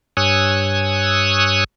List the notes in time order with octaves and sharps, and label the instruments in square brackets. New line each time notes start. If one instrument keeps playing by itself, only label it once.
[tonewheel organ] G2 C#5 G#5 D#6 E6 F#6